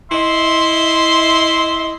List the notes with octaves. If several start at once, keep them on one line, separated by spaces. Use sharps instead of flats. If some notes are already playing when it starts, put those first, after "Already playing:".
E4 D#5 E5 C6